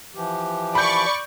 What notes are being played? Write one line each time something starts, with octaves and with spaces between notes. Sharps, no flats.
E3 F3 G4
D5 B5 C#6 G6